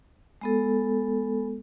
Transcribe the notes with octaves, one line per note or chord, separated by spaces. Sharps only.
G#3 B3 A4